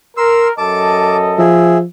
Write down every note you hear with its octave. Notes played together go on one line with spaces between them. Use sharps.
A#4 C6 E6
F#2 A4 D#5 A5 D6
F3 G#4 E5